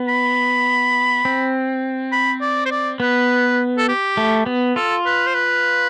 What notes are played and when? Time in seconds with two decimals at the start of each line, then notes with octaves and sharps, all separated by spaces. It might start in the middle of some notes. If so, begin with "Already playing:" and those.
Already playing: B3
0.08 B5
1.25 C4
2.12 B5
2.41 D5
2.66 C5
2.71 D5
3.00 B3 B4
3.78 A4
3.88 G4
4.17 A3
4.46 B3
4.76 F4 A4
5.05 B4
5.27 C5
5.34 B4